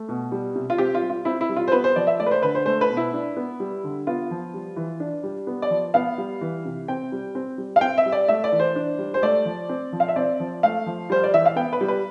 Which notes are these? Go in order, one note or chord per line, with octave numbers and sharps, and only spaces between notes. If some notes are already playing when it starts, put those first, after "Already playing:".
Already playing: A3
B2
G3
C3
F4
C4 G4
F4
G3
F4
C4 E4
E4
G3
F4
C5
B3 B4
C5
F3 D5
E5
A3 D5
B4
C5
D3 B4
C5
A3 C5
B4
B2
E4
D4
B3
G3
D3
B3 F4
F3
G3
E3
D4
G3
B3
D5
F3
B3 F5
G3
E3
C3
C4 G5
G3
C4
G3
F5
C4 G5
E5
G3
D5
A3 E5
D5
E3
C5
D4
G3
C5
A3 D5
F3
C4
F3
F5
E5
C4 D5
F3
A3 F5
F3
G3 C5
D5
E3 E5
F5
B3 G5
B4
G3
B4